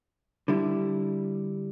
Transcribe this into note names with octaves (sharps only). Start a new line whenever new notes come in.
D3 G3 E4